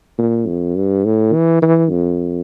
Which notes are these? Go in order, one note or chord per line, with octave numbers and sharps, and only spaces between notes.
A#2
F2
G2
A2
E3
E3
F2